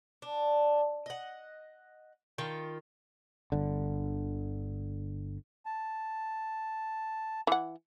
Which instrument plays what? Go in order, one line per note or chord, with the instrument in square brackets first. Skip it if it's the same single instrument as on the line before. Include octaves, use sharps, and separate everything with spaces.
[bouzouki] D4
D#5 F#5
D#3 F4 G5
[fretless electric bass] G1 D3
[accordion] A5
[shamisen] E3 F#5